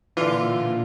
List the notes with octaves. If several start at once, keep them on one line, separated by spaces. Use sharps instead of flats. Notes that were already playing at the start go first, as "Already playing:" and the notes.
A#2 D3 E3 F4